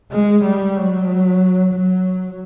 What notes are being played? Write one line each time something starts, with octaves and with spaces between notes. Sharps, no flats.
G#3
G3
F#3
F#3